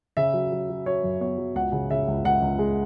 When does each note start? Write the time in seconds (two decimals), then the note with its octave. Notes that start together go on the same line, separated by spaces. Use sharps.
0.17 C#3 E5
0.33 F#3
0.52 F#3
0.69 F#3
0.85 F#3 C#5
1.03 F#2
1.21 B3 C#5
1.37 F#3
1.56 C#2 F#5
1.72 C#3
1.90 C#3 E5
2.08 C#2
2.25 C#2 F#5
2.42 C#2
2.59 G#3